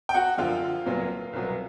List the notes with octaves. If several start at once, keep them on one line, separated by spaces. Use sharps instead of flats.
G5
F#4 F#5
F#2 D3 F3 F4 F5
C2 A#2 F#3 B3
C2 B2 F#3 B3